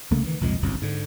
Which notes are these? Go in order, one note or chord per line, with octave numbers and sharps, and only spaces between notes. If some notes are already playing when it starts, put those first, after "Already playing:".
C2 C#3 A3 A#3
D#3 E3
C2 F2 A#2 G#3
G1 C2 F#2
G#2 D3